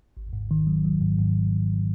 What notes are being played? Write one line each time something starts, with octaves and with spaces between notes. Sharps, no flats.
G#1
G#2
D#3
F#3
F#3
G#2
G#2